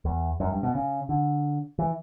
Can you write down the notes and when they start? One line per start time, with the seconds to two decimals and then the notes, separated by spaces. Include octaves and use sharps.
0.05 E2
0.40 F#2
0.52 G2
0.63 B2
0.75 C#3
1.09 D3
1.79 E3